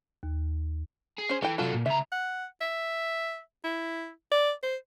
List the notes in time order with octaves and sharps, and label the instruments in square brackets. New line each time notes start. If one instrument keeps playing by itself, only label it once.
[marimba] D#2
[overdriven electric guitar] G#4
[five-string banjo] C#4 C5
[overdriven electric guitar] E3 [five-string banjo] A4 G5
[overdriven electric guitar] C3 A4 [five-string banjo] F#3 F4
[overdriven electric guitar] A#2
[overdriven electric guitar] C#2 A#5 [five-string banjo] E5
[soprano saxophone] F#5
E5
E4
D5
C5